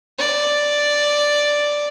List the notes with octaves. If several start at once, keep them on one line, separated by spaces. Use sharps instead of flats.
D5